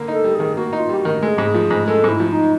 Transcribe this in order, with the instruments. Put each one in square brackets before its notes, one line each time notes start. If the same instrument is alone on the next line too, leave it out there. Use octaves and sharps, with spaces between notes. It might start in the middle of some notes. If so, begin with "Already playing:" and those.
Already playing: [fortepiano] D3 A#3
[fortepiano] D#4 [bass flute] A4
[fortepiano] G3
[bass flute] G#4
[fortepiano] D#3
[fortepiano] A#3 [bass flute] F#4
[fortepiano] D#4
[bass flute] F4
[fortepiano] G3 [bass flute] G4
[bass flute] F#4
[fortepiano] D#3
[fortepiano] G#3 [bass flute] A4
[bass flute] G#4
[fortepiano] G#2 [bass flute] G4
[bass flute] G#4
[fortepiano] F3
G#2
[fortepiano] G#3 [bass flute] A4
[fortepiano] G#2 [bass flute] E4
[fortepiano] F3
[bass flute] D#4